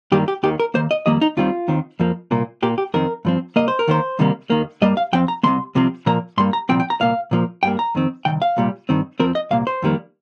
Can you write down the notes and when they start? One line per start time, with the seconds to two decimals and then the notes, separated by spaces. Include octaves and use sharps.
0.12 G2 D#3 G3 A#3 G4
0.28 G4
0.43 D#2 D#3 A#3 G4
0.60 A#4
0.74 D#2 D#3 A#3 C5
0.91 D#5
1.06 F2 D#3 G3 A#3 D#5
1.21 D#4
1.37 D#2 D#3 G3 C4 F4
1.68 D#2 D#3 C4
2.00 F2 F3 A#3
2.31 C2 A#2 A#3
2.63 A#2 A#3 G4
2.78 G4
2.94 F2 D#3 C4 A#4
3.25 G2 F3 C4
3.56 C2 A#2 A#3 D#5
3.68 C5
3.79 A#4
3.88 D#2 D#3 A#3 C5
4.19 C2 C3 D#3 G3 A#3
4.50 D#2 D#3 A#3
4.82 G2 G3 A#3 D#5
4.97 F5
5.13 F2 F3 C4 G5
5.28 A#5
5.43 C2 C3 D#3 A#3 C6
5.75 C2 C3 F3 C4
6.06 A#2 F3 A#3 A#5
6.38 G2 G3 A#3 C6
6.53 A#5
6.69 C2 A#2 F3 C4 G5
6.80 G5
6.90 A#5
7.00 C2 A#2 A#3 F5
7.31 A#2 F3 A#3
7.63 G2 G3 A#3 G5
7.79 A#5
7.95 F2 D#3 C4
8.25 C2 C3 D#3 G5
8.42 F5
8.57 C2 A#2 G3
8.89 G2 D#3 C4
9.20 F2 F3 C4 A#4
9.35 D#5
9.51 C2 A#2 A#3 F5
9.67 C5
9.82 F2 D#3 G3 A#3